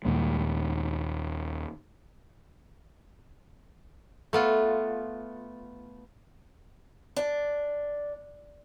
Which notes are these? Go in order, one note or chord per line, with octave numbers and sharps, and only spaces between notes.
D#2 A#2 G#3
A3 B3 F4
D4